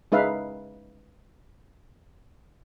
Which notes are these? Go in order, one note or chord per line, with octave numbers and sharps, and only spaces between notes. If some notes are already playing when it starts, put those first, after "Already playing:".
G#3 C#4 D#4 B4 E5 F5